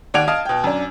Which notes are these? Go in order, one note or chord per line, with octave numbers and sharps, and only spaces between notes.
D#2 D5 F#5 G#6 D7 F7
D#5 F5 A5 D#6 F6
B2 G5
F#2 D4